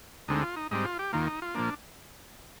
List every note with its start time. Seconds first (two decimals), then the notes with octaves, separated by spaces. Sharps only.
0.28 D2 D3 G#3 C4 D#4
0.43 F4
0.56 D#4
0.71 G#2 G3 C4 D#4
0.85 F4
0.99 G4
1.13 D#2 D#3 A#3 F4
1.27 D#4
1.42 F4
1.55 A#2 F3 A#3 D4